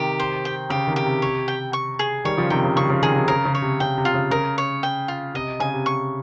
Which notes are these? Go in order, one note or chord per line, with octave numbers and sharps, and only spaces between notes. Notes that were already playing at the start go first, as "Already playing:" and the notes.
Already playing: C3 D#3 G4
C5
G5
C#3 G4
C3 D#3
G4
C3
C#5
G5
C#6
G#4
D#3 G3 C#5
C#3 F3
C3 D#3 G5
C#3
C#3 C#6
C#3 F3
C3 D#3 G#4
C3 D#3
C#3 A#4
C#3
C#5
C3
C#3 G5
C3
F4
C#3
C#3 A#4
C#5
G5
F4
C3 D#5
C#3 G#5
C3
C#6